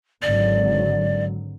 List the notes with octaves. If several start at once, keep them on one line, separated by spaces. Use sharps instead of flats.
G#1 D3 F#3 D5